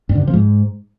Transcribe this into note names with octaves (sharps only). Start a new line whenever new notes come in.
G2
D3
C3
F3
G#2